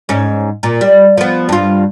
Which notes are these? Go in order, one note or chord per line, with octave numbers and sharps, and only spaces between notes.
G#2 C#4
A#2
G3
F3 B3
G2 F4